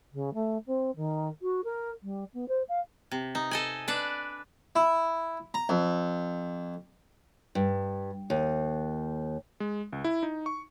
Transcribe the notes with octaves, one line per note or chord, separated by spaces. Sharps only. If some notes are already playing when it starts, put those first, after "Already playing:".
C#3
A3
C4
D#3
F#4
A#4
G3
B3
C5
F5
C3
D#4
A4 D#5 G#5
D4 B4 D5
E4
A#5
F2
G2
D#2
G#3
C#2
E4
D#4
C#6